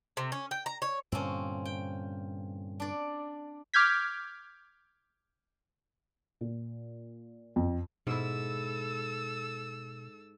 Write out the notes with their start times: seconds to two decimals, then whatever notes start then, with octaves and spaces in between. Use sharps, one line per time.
0.17 C3
0.32 C#4
0.51 G5
0.66 A#5
0.82 C#5
1.12 G2 A#2 D3 C4 C#4
1.65 G5
2.80 D4 D5
3.74 D6 F6 G6 G#6 B6
6.41 A#2
7.56 F2
8.07 G#2 B2 E4 A4 E6